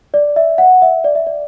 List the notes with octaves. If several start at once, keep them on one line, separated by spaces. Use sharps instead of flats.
D5
E5
F#5
E5
D5
E5
D5